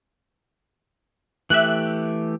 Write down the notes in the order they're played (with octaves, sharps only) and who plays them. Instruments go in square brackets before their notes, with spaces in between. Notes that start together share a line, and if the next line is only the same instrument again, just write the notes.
[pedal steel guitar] E3 A3 G4 [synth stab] E5 F#6